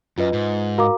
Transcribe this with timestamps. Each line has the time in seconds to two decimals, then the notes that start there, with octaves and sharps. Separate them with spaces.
0.18 F#2 F4 B4 D#5
0.33 G#2
0.78 F#4 A#4 F5 A#5 D6